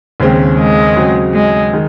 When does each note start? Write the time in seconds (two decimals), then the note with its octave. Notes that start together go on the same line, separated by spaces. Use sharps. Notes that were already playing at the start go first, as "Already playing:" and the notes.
0.20 D#2 C#3 G#3 C4
0.58 G#3
0.96 C#3 F#3 C4
1.34 G#3
1.73 D#3 G#3